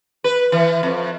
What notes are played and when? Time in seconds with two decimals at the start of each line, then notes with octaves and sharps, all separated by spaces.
0.24 B4
0.52 E3
0.83 F2